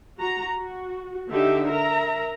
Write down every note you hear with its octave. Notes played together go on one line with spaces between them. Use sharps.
F#4 A#5
F#4
D3 D#4 G4 E5
A#4 E5 A#5